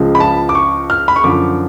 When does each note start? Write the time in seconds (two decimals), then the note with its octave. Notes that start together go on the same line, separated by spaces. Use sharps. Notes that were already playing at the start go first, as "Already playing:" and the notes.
Already playing: C#2 C#3 F3
0.15 B5
0.20 A5
0.49 D6
0.55 C#6
0.90 F6
1.08 B5
1.16 C#6
1.24 F#2 D3 F3 D6